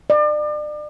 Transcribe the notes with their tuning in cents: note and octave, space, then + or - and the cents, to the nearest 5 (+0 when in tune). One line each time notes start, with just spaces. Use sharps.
D5 +35